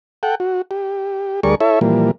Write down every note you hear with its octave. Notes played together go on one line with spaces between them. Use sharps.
A4 F#5 G5
F#4
G4
D2 G3 G#4 A#4 D5 C#6
E4 A4 C#5 E5
A#2 E3 F3 G3 A#3